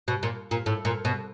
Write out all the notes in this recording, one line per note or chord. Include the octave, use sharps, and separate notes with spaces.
B2
A#2
A#2
A2
A#2
B2